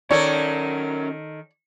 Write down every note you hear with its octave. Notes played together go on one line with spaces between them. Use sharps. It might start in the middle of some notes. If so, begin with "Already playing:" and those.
D#3 C#4 A4 A#4 C#5 D5